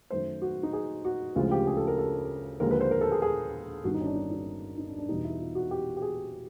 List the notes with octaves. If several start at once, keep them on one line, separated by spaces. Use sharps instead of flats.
F#2 D#3 F#3 A3 C5
F#4
D#4
G#4
F#4
D2 C#3 F3 G#3 F4
G4
G#4
A4
A#4
A4
D#2 D3 F3 G#3 A#4
B4
C5
A#4
A4
G#4
G#4
G1 G2 D#3 G3 F#4
D#4
C#4
D4
D#4
D#4
D#4
D4
D4
E2 B2 G3 D#4
E4
F4
F#4
G4
G4
G#4